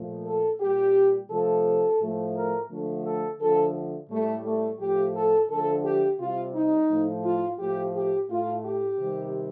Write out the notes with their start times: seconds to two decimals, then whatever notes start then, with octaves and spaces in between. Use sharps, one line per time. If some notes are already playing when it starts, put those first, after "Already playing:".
Already playing: A#2 F3 A3
0.26 A4
0.60 A#2 G3 G4
1.30 C3 F3 A3 A4
2.00 A2 F3 A3
2.35 A#4
2.70 D3 F3 A3
3.05 A4
3.40 D3 F3 A3 A4
4.10 A2 G3 A3
4.45 A3
4.80 A2 F3 A3 G4
5.15 A4
5.49 D3 F3 A3 A4
5.84 G4
6.19 C3 G3 F4
6.55 D#4
6.90 A2 F3 A3
7.24 F4
7.59 A2 F3 A3 G4
7.95 G4
8.29 A2 A3 F4
8.64 G4
8.99 C3 D#3 G3